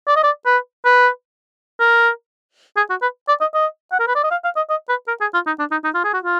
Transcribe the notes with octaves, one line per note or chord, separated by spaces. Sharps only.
D5
D#5
D5
B4
B4
A#4
G#4
F#4
B4
D5
D#5
D#5
F#5
A#4
B4
D5
D#5
F5
F5
D#5
D#5
B4
A#4
G#4
F4
D#4
D4
D#4
D#4
F4
G#4
F#4
F4